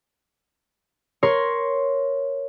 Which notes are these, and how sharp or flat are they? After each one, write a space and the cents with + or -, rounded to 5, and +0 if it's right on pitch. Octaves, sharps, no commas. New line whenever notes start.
A#4 +10 C#5 +0 C6 +0